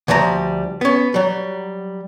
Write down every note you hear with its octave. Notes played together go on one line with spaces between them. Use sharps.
D2 F3 G3 D5 A#5
B3 C#4
F#3 G3